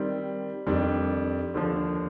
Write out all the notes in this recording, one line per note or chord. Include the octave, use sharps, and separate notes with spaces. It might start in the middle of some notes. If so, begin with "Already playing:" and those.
Already playing: D#3 G3 C4
F2 D#3 G3 D4
D#2 D3 F3